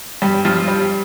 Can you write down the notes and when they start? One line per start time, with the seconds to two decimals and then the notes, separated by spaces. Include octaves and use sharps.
0.22 G2 G3 G4
0.45 G2 F3 F4
0.67 G3 G4